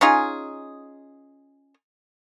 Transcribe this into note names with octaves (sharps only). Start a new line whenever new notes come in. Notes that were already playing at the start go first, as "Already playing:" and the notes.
C#4 D#4 F4 G#4